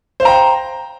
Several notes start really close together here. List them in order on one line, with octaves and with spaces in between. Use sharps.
C5 F5 A#5 G5